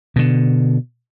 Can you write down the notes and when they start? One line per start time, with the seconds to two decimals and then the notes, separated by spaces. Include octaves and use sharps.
0.16 B2 D3